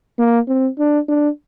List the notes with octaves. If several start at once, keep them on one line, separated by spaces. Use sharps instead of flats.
A#3
C4
D4
D4